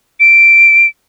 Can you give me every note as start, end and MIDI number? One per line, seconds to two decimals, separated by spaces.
0.20 0.86 98